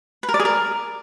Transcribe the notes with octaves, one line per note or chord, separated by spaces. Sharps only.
B4
A#4
D5
G#4
A#4